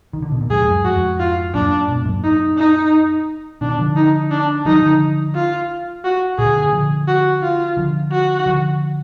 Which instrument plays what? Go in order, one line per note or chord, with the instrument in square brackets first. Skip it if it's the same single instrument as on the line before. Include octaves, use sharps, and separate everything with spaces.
[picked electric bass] D#3
D3
B2
A#2
[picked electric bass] F2 G#2 [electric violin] G#4
[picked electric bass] F#2
[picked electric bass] F2 G#2 [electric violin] F#4
[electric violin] F4
[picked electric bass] F#2 A#2 [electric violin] D4
[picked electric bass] G#2 B2
F#2 A#2
[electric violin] D#4
D#4
[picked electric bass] B2 D#3 [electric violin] D4
[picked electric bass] D3 F3
[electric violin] D#4
D4
[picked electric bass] D#3 F#3 [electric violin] D#4
[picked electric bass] D3 F3
[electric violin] F4
F#4
[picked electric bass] A#2 D3 [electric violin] G#4
[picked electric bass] A#2 D3
D3 F3
[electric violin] F#4
F4
[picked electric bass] D3 F3
[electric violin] F#4
[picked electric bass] D3 F3